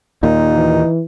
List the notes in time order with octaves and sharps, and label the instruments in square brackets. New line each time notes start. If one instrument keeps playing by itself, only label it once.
[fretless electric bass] D#2 A#2 [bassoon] D#4
[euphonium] E3